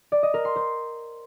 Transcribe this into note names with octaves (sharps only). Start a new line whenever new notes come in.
D5
D#5
A#4
C6
C5